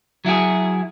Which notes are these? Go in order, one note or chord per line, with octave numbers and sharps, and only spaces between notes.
F#3 E4 F#4 G#4